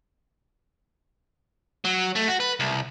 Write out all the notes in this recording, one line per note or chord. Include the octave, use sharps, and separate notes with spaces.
F#3
A3
F#4
B4
C2